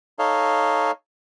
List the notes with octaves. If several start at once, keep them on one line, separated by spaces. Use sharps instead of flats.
D#4 A4 C#5 D#5 F5